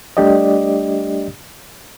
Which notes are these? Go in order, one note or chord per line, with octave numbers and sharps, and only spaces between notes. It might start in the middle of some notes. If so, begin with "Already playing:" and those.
G3 A3 D4 G4 D5 D#5